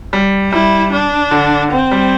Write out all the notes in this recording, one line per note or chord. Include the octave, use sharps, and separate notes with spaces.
G3
G3 E4
D4
D3
C4
G3